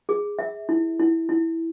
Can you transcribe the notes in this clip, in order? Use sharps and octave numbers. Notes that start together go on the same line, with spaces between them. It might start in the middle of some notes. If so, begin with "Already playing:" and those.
G#4
E5
E4
E4
E4